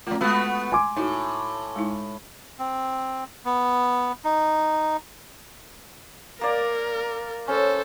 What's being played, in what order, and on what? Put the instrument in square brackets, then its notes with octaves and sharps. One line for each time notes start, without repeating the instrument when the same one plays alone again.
[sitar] F2 A#3 [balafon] A3 F4
[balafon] G#3 [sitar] A3 B3 F#4
[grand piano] G#5 C6 D6
[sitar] A2 [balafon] D#4 E4 F#4
[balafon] G#3 D#4 E4
[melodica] C4
B3
D#4
[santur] A#3 D5 A#5 [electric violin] A#4
[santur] C#4 [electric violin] A4 C5